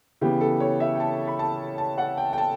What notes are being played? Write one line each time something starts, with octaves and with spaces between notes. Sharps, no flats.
C#3 E3 B3 G4
A4
C#5
E5
G5
A5
B5
A5
A5
F#5
G5
G5
A5